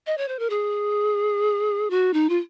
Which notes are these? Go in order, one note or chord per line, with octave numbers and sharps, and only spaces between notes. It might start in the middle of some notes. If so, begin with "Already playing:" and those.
D#5
C#5
C5
A#4
G#4
F#4
D#4
F4